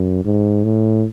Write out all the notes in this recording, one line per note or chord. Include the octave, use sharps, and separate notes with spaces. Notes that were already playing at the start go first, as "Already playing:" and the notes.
Already playing: F#2
G#2
A2